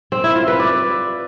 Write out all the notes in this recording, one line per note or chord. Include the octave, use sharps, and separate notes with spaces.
C4
E4
F4
B4
D5